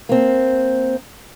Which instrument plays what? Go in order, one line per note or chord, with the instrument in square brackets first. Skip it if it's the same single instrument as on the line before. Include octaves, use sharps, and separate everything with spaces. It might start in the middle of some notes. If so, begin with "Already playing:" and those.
[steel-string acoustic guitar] A#3 C4